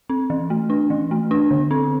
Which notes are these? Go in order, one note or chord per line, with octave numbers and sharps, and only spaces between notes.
C4
E3
A3
D4
E3
A3
D4
D3
C4